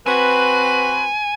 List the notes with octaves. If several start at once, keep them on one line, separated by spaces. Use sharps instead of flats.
C4 F#4 B4 G#5